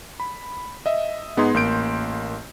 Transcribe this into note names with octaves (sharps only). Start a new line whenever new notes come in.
B5
D#5 E5
G#2 B3 D#4 G#4 C6
A1 A#3 C6 G6 D7